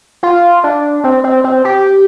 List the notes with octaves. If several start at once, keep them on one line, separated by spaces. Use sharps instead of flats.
F4
D4
C4
C4
C4
G4